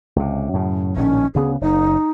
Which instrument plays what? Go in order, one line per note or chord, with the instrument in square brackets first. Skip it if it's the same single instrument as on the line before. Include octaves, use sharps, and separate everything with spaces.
[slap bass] C#2 C3
F#2 A2 C#3
[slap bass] A#1 A2 D#3 [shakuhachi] C#4
[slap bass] D2 C#3 B3 [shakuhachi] G#4
[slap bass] F#1 [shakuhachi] D#4